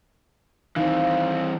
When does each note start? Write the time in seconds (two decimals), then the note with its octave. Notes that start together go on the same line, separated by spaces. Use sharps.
0.76 D#3 E3 C4 F5